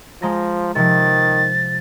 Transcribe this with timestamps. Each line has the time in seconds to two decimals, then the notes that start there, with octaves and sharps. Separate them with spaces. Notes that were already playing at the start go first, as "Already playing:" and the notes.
0.22 F3 G#3 A#5 A#6
0.75 C3 D#3 F3 A6